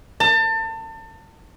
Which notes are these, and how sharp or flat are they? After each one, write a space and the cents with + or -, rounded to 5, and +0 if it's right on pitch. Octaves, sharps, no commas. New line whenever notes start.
A5 +30